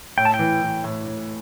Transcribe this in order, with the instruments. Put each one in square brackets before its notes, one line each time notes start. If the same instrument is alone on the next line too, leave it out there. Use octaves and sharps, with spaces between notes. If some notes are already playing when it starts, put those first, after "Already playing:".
[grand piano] A2 [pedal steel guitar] G5
[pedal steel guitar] A5
G5
[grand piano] E3
E3
A2
A2